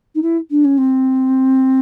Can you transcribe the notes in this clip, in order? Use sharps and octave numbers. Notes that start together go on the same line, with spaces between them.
D#4
E4
D4
C#4
C4